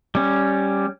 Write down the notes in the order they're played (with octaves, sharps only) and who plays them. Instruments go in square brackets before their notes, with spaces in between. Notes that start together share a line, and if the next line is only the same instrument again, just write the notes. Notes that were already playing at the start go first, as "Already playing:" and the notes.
[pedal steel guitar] G3 C#4